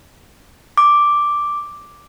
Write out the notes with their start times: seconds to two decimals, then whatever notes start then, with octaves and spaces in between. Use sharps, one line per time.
0.78 D6